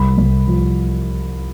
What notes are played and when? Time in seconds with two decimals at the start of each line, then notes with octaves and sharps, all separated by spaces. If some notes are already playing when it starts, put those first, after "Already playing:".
Already playing: C2 B5
0.18 C2
0.47 F3